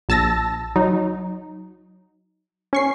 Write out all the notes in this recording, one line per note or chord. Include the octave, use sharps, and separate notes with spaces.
A#1 A5 E6 A6 A#6
F#3 D#4
C#4 C#6 C7